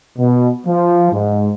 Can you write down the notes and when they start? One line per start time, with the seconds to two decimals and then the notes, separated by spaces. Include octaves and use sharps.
0.18 B2
0.66 F3
1.12 G#2